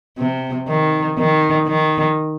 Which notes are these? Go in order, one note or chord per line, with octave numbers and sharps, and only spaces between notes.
C3
D#3
D#3
D#3